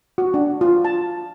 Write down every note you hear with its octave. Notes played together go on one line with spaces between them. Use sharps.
F#4
D4
F4
A5